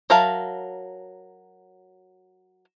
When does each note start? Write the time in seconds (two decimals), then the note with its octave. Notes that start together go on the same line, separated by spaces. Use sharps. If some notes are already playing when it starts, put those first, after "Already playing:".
0.10 F#3 A#4 E5 F5 A5